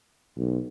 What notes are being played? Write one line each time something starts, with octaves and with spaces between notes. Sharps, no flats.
B1